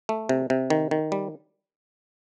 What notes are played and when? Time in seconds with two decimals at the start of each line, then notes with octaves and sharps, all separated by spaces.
0.09 A3
0.29 C3
0.50 C3
0.70 D#3
0.91 D#3
1.12 G3